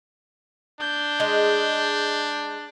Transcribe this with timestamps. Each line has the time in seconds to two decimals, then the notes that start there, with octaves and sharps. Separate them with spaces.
0.81 D4 G6
1.20 G#3